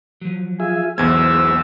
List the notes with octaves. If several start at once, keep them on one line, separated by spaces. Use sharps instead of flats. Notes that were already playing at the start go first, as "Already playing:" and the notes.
F3 F#3
F4 G#4 E5 G#5
B1 E2 G#3 B3 E4 C5 E6 G#6